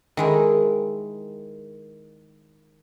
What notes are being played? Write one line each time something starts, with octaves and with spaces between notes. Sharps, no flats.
D#3 G#3 E4